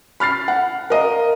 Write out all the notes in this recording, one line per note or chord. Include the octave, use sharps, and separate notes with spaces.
B5 F6 A6 C7
F#5
A#4 D#5 F5